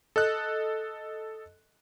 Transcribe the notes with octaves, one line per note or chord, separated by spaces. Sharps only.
A4 D#5 F#6